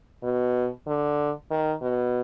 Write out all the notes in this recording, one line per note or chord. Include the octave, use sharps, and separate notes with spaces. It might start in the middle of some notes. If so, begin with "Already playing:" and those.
B2
D3
D#3
B2